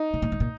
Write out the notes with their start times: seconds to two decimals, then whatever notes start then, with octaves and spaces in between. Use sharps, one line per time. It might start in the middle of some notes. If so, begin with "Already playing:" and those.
Already playing: D#4
0.14 B2
0.22 A#2
0.32 G#2
0.40 A#2